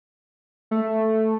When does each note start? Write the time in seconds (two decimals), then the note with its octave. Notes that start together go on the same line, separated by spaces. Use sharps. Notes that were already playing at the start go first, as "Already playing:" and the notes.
0.71 A3